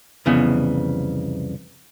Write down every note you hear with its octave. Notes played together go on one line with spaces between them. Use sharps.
C2 F2 C#3 E3 B3